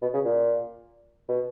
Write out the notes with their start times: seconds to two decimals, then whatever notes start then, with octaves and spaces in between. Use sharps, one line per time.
0.02 B2
0.14 C#3
0.25 A#2
1.29 B2